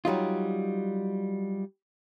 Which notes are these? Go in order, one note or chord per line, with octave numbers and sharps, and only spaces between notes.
F#3 G3 D#4 F4